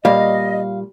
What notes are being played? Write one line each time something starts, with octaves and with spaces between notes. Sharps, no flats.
A#2 G3 D#5 F5